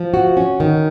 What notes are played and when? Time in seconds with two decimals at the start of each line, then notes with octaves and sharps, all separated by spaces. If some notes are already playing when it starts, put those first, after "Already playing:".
Already playing: F3
0.14 F#4
0.37 C#4
0.60 D#3